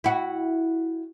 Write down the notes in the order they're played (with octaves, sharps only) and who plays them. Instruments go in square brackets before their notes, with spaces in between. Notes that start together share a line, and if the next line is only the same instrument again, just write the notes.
[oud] E4 F#4